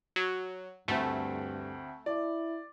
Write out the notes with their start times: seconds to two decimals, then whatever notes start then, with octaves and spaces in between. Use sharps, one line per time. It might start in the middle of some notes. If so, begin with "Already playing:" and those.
0.16 F#3
0.88 D2 G2 A3 C4
2.06 E4 D5